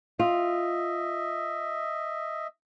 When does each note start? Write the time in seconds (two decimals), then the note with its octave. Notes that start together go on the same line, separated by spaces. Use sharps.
0.19 F4 D#5 E5